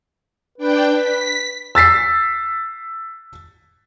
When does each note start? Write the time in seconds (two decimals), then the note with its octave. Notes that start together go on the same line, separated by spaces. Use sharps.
0.58 D4 B4 G5
0.96 B6
1.75 E6 A6 B6 C7